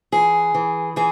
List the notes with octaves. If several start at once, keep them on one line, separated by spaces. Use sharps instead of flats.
E3 G#4
E3
E3 G#4